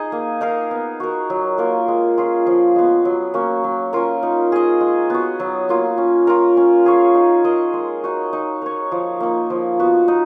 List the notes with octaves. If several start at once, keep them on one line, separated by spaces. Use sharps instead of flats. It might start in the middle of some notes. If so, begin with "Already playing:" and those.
Already playing: D#4 G#4 D#5
A#3
D#4 A#4 F5
B3
F#4 A#4
F#3
A#3 F4 A#4
G#3
C#4 F4 G#4
F3
G#3 B3
F#3
A#3 C#4 F#4
F#3
C#4 F4 A#4
D#4
G#4 D#5
G#3
B3 F#4
F#3
A#3 F4
C#4
F4 A#4
C#4
G#4 C#5 F5
D#4
A#4 D#5
G#3
D#4 F#4
D#4
A#4 C#5
F3
A#3 D#4
F3
B3 F#4
D#4